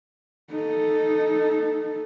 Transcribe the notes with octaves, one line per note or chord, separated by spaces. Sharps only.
D#4 A4